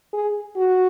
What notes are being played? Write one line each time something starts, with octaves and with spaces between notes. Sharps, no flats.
G#4
F#4